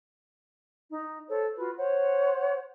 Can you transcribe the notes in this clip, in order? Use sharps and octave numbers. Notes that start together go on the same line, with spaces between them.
D#4
A4 C5 C#5
F4 F#4 B4
C5 C#5 F#5